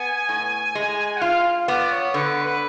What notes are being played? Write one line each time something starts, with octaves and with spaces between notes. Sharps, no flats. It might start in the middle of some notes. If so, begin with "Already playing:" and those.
Already playing: B3 G#5
A2
G#3
F#5
F4 F5
B3 D5
C#5
D3 B4
B4